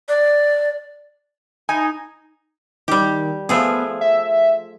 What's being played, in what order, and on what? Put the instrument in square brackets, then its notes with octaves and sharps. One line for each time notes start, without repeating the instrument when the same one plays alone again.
[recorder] D5
[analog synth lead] D#4 [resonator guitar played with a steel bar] G#5
[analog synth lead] D#3 [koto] G3 G4
[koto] F3 A3 G#4 [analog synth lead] B3
[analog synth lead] E5